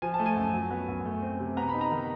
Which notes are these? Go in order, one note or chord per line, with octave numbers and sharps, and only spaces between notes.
F3 G#5
A5
A3
G#5
F#2
F#3
B3
F#2
A3
C4
C3
B3 A#5
D#4 B5
A#5
D#3